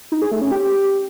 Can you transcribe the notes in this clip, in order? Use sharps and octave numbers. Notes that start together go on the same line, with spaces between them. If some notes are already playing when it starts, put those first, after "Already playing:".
D#4
G#4
A3
C#4
G4